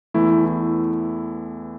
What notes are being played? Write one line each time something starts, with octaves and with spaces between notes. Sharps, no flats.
E2 E3 A3 E4
E4